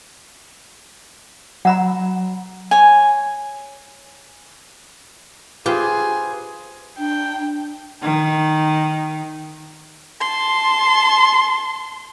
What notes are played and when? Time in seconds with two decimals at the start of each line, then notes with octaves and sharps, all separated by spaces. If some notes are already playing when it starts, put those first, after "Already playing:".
1.65 F#3 F#5 A#5 B5
2.71 C#5 G#5
5.66 F4 G4 G#4 B4 C5 C6
6.99 D4 G5
8.02 D#3
10.20 A5 C6